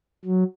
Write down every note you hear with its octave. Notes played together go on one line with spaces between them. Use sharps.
F#3